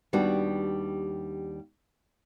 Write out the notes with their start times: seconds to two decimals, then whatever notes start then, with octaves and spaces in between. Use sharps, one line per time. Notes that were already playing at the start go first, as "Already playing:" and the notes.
0.13 D#2 G3 B3 D4 F#4